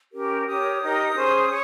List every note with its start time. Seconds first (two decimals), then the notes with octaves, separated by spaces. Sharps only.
0.13 C#4 G4 A#4
0.47 G4 A#4 C#5 D#6
0.81 D#4 G4 A#4
1.15 C#4 G#4 C5
1.49 C#5